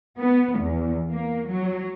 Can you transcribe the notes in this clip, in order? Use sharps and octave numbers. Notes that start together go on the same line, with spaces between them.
B3
E2
A#3
F#3